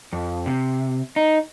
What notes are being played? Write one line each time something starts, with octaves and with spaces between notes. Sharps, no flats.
F2
C3
D#4